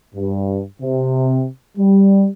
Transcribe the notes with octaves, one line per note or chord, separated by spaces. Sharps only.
G2
C3
G3